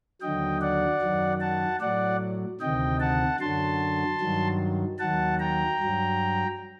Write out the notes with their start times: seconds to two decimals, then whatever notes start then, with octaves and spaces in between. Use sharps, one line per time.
0.21 D#2 D3 F#3 D#5 G5
0.61 D5 F#5
1.01 F#2 D#3 F#3
1.40 F#5 A5
1.80 A2 F#3 D5 F#5
2.61 D2 C3 D#3 D#5 G5
3.00 F#5 A5
3.40 F#2 D3 F#3 A5 C6
4.20 G2 D#3 F#3
4.99 D#2 D#3 F#3 F#5 A5
5.39 G5 A#5
5.80 G2 F#3